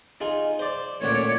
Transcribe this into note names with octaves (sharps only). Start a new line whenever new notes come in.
D#4 F4 G#4
C5 D5
A1 A#2 C#5 D5 F#5